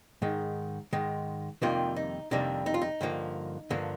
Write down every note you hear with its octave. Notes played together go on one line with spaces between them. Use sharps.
G#2 D#3 G#3
G#2 D#3 G#3
F2 C3 D#3 G3 A#3 F4
D#4
F2 C3 D#3 G3 A#3 D4
D#4
F4
D#4
G2 D3 F3 A#3
G2 D3 F3 A#3